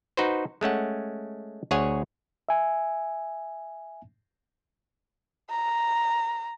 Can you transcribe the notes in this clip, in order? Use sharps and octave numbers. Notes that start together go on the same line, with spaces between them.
D#4 F#4 B4 C5
G#3 A3 C#4 F#5
D2 G#4 C#5 F#5 G#5
E5 G#5
A#5